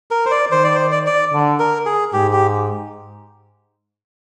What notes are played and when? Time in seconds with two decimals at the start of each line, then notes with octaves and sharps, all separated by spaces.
0.11 A#4
0.26 C5
0.31 D5
0.51 D#3 C5
0.64 D5
0.75 C5
0.92 D5
1.06 D5
1.33 D3
1.60 A#4
1.86 G#4
2.13 G#2 G4
2.33 G4